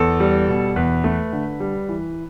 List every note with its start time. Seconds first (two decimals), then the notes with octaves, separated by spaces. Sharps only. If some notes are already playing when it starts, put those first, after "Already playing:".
Already playing: E2 A4
0.20 G3
0.48 B2
0.76 E2 B4
1.04 A3
1.33 D3
1.60 G3
1.89 E3